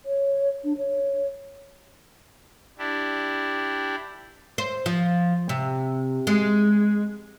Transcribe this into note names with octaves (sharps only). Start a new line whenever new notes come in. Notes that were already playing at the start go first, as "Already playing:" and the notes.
C#5
D4
C#5
D4 E4 G4
C5
F3
C3
G#3